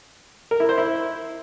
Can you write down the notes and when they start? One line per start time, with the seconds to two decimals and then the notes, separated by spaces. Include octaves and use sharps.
0.51 A#4
0.60 E4
0.69 C5
0.78 E4